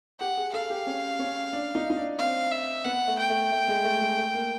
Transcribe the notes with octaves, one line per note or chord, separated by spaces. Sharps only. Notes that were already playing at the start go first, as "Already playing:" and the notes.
G4 F#5
G#4
A4 F5
G4
C#4
C#4
D4
D#4
D#4
D4
C4 F5
E5
B3 F#5
A3
G5
A3
A3
G#3
A3
G#3
A3
A#3